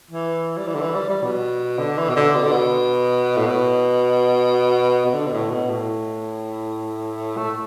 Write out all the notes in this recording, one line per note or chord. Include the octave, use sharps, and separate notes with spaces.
E3
G3
E3
D3
E3
G3
G3
B2
D3
E3
B2
D3
B2
D3
B2
A2
B2
B2
D3
B2
A2
B2
A2
A3